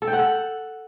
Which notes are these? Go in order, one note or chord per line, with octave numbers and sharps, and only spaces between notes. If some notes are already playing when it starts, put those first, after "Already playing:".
A4
G5
F#5
A4